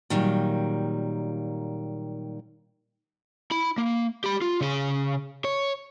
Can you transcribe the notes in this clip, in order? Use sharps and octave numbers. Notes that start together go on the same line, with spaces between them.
A#2 D#3 F#3 G3
E4 B5
A#3
G4 B5
F4
C#3 G#4
C#5